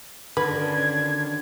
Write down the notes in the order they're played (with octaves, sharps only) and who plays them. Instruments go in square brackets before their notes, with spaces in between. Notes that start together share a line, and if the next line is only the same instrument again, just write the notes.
[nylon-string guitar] D3 D#3 F#4 [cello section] C#4 D4 [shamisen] B4 [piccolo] G#6